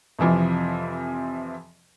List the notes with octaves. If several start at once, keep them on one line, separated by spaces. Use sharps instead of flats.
F2 C3 E3 F3